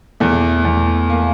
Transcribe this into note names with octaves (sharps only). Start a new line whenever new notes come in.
E2 A3
E2
A#3